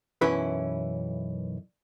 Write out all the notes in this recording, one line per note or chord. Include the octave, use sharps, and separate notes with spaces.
B1 F#2 E3 C#4 E4 B4